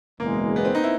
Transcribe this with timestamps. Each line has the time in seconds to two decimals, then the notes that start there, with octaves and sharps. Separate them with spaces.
0.20 F#1 E2 B2 G#3 A#3
0.56 B3
0.65 C4
0.75 D#4
0.84 E4